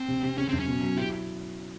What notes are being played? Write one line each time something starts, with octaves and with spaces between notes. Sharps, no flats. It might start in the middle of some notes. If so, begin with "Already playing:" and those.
Already playing: C4
C3
C3
C#3 C#4
F#2 C4
C#4
B2
F#3
E4 G4